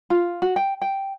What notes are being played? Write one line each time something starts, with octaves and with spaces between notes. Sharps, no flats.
F4
F#4
G5
G5